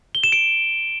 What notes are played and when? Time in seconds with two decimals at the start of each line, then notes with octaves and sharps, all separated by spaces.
0.15 G7
0.24 E7
0.32 D7